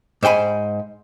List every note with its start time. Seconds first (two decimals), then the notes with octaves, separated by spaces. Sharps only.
0.23 G#2 C5 G5 G#5 B5